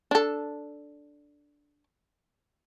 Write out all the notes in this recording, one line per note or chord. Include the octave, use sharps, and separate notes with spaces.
D4 A4